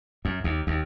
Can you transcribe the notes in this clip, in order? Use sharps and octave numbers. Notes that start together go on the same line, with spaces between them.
F#2
D#2
D#2